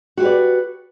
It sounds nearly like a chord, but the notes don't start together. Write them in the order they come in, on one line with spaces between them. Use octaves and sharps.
F#4 G4 B4 D5